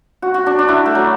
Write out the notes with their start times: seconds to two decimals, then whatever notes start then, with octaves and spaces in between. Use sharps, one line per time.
0.22 F#4
0.34 F#4
0.46 D4
0.59 D4
0.68 E4
0.86 A3
0.95 F#3